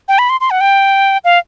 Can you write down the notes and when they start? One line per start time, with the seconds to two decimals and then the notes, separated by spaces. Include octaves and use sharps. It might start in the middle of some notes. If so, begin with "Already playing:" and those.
0.08 G5
0.19 B5
0.29 C6
0.41 C6
0.51 F#5
0.61 G5
1.24 F5